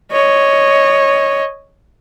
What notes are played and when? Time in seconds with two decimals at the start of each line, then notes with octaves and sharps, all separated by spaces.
0.12 C#5 D#5